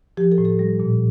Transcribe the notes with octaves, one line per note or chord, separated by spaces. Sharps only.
F3 G4
A4
A2
A4
G3
A#2